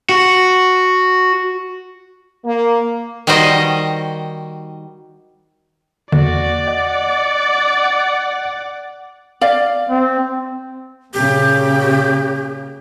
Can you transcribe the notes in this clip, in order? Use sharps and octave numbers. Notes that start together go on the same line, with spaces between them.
F#4
A#3
D#3 G3 F#4 C5 D#5
E2 D3 A#3 F#4 D5
D#5 F#5
D5 F5
C4
A#2 C#3 G4